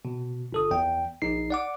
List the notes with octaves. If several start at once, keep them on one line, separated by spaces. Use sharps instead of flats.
B2
G1 A4 D#6
E2 G5
A#1 D#4 C7
D5 F#5 D6